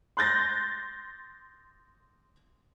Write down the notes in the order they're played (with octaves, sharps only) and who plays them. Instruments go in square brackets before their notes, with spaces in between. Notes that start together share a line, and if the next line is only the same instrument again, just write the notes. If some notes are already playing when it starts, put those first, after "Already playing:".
[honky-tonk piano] C6 F#6 G6 A6 A#6